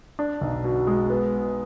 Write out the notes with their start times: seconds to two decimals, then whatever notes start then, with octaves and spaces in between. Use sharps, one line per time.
0.19 D4
0.41 B1
0.64 B2
0.87 G#3
1.10 B3